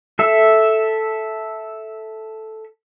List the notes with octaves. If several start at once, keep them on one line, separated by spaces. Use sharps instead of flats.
A4 E5